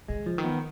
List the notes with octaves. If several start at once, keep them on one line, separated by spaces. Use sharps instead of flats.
C3 G#3
C#3
F3
D#3
B3